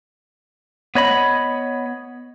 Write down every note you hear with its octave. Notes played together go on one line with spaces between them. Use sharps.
B3 C#5 D#5 B5